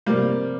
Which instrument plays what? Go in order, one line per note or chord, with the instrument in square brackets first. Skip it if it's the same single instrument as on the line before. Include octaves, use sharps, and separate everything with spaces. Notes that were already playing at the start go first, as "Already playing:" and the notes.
[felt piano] C3 F3 C4 [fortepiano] G3 A#3